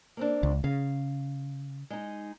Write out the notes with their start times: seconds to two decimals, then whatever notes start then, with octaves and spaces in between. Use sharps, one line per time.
0.17 A#3 C4 D4
0.43 C#2
0.64 C#3 F5
1.90 G#3 D#4